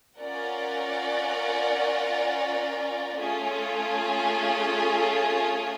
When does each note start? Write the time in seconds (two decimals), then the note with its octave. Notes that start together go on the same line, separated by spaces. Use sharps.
0.18 C#4 F4 A#4 D5 F#5
3.17 A3 C#4 F4 G#4